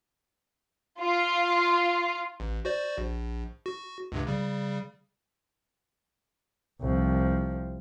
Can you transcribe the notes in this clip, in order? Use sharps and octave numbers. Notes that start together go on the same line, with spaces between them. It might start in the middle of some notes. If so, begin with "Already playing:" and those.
F4
A1
F#4 C5 D5
A#1
F#4
C#2 G2 C3
C#3 G3
C2 F3